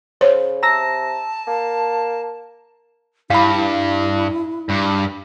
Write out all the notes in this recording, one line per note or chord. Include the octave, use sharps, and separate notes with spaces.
C#3 C5 C#5
C3 A5 A#5 E6 A#6
A#3
G2 E4 F5 B5
E4
G2